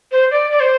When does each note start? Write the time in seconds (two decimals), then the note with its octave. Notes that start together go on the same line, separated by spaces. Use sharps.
0.12 C5
0.31 D5
0.51 D5
0.60 C5